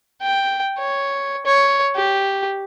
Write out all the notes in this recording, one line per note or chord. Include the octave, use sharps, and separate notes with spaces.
G5
C#5
C#5
G4